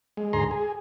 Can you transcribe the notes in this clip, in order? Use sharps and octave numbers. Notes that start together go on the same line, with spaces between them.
G#3
D2 G#2 G#4 A#5 C6
G#4